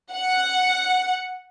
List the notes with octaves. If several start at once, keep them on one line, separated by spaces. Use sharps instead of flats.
F#5